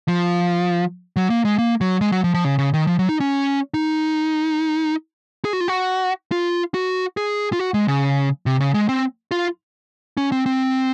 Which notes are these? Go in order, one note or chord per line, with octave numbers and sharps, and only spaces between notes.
F3
F#3
A#3
G#3
A#3
F#3
G#3
F#3
F3
F3
C#3
C#3
D#3
F3
F#3
D#4
C#4
D#4
G#4
F#4
F4
F#4
F4
F#4
G#4
F4
F#4
G#3
C#3
C3
C#3
G#3
C4
F4
C#4
C4
C4